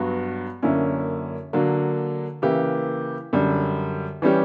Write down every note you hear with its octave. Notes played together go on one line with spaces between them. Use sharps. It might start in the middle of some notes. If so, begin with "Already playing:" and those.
Already playing: G2 F#3 B3 F#4
F#2 D3 A#3 C#4 E4
D3 F#3 A#3
C#3 E3 A#3 E4 G4
F#2 D3 G3
E3 G3 C#4 G4